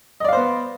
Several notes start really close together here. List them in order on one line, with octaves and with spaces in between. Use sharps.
D#5 D5 F5 C5 B3